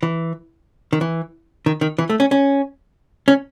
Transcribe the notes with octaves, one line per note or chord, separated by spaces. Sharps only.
E3
D#3
E3
D#3
D#3
E3
A3
C#4
C#4
C#4